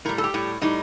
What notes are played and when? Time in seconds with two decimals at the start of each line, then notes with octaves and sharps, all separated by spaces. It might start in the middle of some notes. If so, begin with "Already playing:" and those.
0.05 A2 A#4
0.09 G3
0.18 A4
0.24 G4
0.34 A2 G3
0.62 A2 G3 D#4